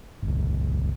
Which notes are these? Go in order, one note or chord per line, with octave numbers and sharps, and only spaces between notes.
G1 C#2